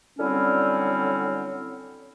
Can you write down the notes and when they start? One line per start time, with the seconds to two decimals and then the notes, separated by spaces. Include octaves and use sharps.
0.19 D3 F#3 G3 C4 C#4 E4